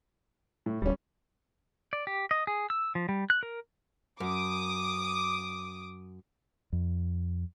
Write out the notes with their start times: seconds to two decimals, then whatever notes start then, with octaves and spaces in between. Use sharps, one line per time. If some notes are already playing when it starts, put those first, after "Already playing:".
0.66 A2
0.82 D1 G3 C#4
1.93 D5
2.07 G4
2.31 D#5
2.47 G#4
2.70 E6
2.95 F3
3.09 G3
3.30 F#6
3.43 A#4
4.20 F#2 D6 D#6
6.73 F2